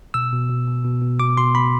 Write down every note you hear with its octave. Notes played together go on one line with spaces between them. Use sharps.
B2 E6
B2
B2
B2
B2
B2
B2 D6
B2 C6
B2 B5